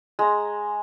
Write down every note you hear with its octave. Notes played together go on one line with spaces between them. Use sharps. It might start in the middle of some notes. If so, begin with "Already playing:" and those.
G#3 A#5